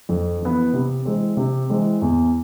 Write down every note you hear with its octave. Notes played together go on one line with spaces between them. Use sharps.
F2
E3 B3
C3
E3 G#3 C4
C3
E3 G#3 C4
E2